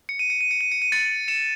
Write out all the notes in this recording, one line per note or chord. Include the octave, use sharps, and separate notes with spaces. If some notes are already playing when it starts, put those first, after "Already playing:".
C#7
D#7
C#7
D#7
C#7
D#7
C#7
D#7
A6 C#7
C#7 E7